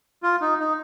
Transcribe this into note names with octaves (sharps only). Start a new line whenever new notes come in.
F4
D#4
D#4